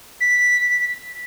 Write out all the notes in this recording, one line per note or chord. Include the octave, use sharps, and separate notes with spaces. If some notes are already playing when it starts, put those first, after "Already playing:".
B6